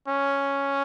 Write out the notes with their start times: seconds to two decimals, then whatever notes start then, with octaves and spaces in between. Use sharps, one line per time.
0.08 C#4